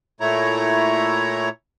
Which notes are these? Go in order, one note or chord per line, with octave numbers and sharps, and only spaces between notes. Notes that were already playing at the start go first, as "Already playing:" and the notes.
A#2 A3 E4 C#5 A#5